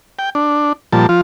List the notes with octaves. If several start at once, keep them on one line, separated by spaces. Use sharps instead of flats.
G5
D4
A#2 F3 G3 A5
F3 F4